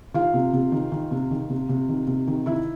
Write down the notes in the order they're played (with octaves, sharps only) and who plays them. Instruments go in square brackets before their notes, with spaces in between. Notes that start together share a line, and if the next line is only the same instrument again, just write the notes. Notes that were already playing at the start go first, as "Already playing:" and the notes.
[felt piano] D#3 F4 F5
C3
C3
D#3
D#3
C3
D#3
C3
C3
D#3
C3
D#3
D#3 E4 E5